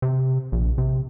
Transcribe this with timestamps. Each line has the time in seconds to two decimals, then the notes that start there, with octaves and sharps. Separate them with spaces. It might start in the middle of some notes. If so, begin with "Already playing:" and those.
0.02 C3
0.52 A#1
0.78 C3